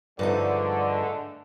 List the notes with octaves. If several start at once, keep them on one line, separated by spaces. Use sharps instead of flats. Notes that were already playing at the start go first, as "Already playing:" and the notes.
G2 D3 F3 G#3 A3 D#4 D5